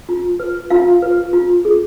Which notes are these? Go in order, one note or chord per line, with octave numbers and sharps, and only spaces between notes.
F4
B4
F4 F5
B4
F4
G#4